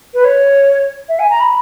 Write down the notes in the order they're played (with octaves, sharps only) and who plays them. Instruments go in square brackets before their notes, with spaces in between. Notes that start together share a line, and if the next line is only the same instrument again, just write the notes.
[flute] B4
C#5
E5
G#5
A#5
B5